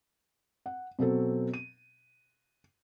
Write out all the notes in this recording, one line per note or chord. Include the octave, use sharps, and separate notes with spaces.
F#5
B2 F#3 C4 A4
D#7